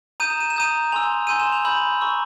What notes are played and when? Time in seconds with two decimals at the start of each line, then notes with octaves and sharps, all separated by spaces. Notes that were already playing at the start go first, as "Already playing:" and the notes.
0.20 A#5 D#6 G6 D#7
0.30 E7
0.40 D#7
0.50 E7
0.56 A#5 D#6 G6 D#7
0.92 G#5 C6 E6 F7
1.27 G#5 C6 E6 G6 D#7
1.40 E7
1.52 F7
1.65 B5 E6 G6 F#7
2.01 A#5 C#6 E6